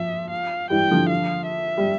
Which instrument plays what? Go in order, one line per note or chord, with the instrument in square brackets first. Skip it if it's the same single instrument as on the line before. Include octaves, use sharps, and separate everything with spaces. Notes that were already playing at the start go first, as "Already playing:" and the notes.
Already playing: [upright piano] F3 [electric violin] E5
[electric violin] F5
[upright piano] E3 G3 [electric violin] G5
[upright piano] D3 F3
[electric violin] F5
E5
[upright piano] G3